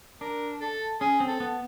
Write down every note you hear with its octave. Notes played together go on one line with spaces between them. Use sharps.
D4 A#4
A4
C#4 G#4
C4
A4
B3